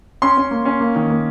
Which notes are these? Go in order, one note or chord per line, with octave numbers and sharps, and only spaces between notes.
C#4 C6
C#4
A#3
C#4
A#3
D#3
A#3